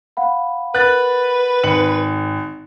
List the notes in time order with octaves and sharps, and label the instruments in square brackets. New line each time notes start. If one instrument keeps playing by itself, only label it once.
[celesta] F5 F#5 B5
[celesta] A#4 F#5 [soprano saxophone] B4 [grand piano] F#6 A6
[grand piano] G#1 C#7 F#7